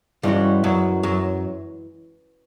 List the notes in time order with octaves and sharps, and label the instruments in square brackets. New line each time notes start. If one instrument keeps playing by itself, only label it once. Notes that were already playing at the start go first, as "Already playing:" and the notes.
[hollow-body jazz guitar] G2 G3 [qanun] E3 G#3 C#4 F#4
[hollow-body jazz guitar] F#2 F#3
F#2 F#3